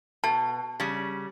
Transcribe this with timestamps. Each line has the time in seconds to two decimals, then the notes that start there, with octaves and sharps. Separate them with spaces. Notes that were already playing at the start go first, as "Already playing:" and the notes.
0.24 B2 A5
0.80 C#3 G3